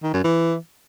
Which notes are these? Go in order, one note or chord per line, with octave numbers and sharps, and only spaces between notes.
D#3
F#2
E3